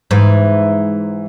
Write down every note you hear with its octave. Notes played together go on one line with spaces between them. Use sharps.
G#2 E3